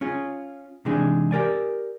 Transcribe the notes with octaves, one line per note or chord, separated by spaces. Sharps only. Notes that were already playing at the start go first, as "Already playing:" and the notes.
C#4 F4 G#4
C3 E3 G#3 D4 D#4 G#4
G4 A#4 D5 G#5